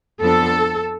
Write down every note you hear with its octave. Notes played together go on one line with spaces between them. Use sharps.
F2 F3 B3 D4 A4